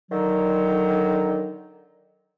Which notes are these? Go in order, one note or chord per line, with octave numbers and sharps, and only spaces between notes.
D3 D#3 F#3